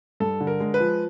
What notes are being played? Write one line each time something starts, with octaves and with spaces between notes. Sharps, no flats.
G2 A4
D3
A#4
G#3
B4
F3